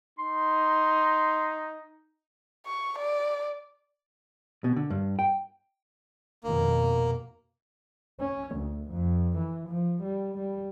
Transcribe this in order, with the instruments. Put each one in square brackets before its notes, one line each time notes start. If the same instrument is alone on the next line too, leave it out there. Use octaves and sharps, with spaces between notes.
[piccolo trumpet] D#4 [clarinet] C6
[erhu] C#6
D5
[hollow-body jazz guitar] B2
D3
G2
G5
[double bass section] F1 B2 D#3 [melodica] A#3
[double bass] C#4
D2
F2
E3
F3
G3
G3